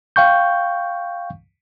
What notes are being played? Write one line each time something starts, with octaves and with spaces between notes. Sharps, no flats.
F5 G5 C#6 G6